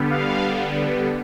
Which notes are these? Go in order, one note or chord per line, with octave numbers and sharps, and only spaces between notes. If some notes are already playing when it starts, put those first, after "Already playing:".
Already playing: D3 G3 B3
F5